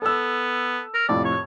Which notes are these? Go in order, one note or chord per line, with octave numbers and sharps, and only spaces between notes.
B3 A4 E6
A#4
F2 A2 C3 D5
C#5